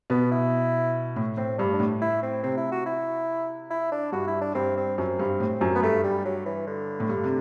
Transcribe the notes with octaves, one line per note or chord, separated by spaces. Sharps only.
B2 B3
E4
A2
A2 C4
G2 D4
D4
A2
E4
C4
C3 C4
E4
F#4
E4
E4
D4
G2 F#4
E4
D4
G2 C4
C4
F#2 C4
G2
A2
F#2
B3
G2 A3
G3
F#3
E3
D3
A2
G2
C3